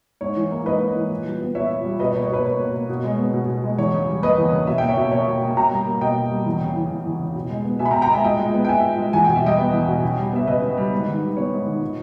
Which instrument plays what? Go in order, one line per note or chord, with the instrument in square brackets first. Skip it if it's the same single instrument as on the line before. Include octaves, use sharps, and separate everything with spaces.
[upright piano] G#2 C#5
E3
A#3
G#2 B4 D#5
G#2
E3
A#2
G3
B3
A#2 C#5 E5
A#2
G3
B2 B4 D#5
C#5
A#3
C#5
B2 B4
A#3 C#5
B2
A#3
B2
G#3
B3
B2
B2
G#3
E2 C#5
C#3
G3
A#3 B4 D#5
E2
C#3
B2 E5
A#3 G5
C#5 E5
B2
A#3 C#5 E5
B2
A#3
B2 G5 A#5
G3
A#3
B2 D#5 G5
B2
G3
E2
C#3
E3
E2
E2
C#3
B2
G#3
B3
B2 E5 G#5
B5
G5 A#5
B2
G5 A#5
G#3 E5 G#5
A#2 D#5 G5
G#3
B3
G5
A#2 E5 G#5
A#2
G#3
E2 G#5
B2 G5
E5
G3 D#5 G5
B3
E2
B2
C#3
G3
B3 E5
C#3 B4 D#5
C#3
G3
G#2
D#3
G3
B3 C#5
G#2
D#3
A#2